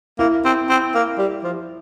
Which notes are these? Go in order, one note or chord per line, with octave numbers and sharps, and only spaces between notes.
A#3 E4
C4
C4
A#3
G3
F3